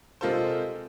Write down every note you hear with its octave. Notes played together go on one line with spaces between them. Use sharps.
C3 G#3 F4 A4 A#4 C5